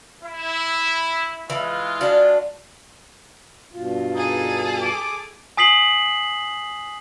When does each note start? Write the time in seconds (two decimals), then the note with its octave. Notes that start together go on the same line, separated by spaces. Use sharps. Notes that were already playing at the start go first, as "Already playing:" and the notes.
0.23 E4
1.50 E3 G#3 F4
2.01 D4 F#4
3.73 G2 B2 F4
4.15 D#4 G#4 A4
4.81 D6
5.57 G#5 D#6 B6 C7 F#7